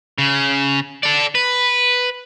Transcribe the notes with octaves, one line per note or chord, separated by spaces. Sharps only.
C#3
A4 D5
B4